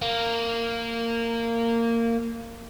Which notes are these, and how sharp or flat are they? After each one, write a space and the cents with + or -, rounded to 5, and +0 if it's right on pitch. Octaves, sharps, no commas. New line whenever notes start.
A#3 -15